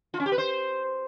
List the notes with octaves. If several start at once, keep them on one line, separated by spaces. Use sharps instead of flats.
F4
C#4
G4
B4
C5